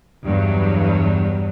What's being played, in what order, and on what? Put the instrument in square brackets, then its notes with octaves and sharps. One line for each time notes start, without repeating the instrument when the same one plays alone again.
[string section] E2 G2 F#3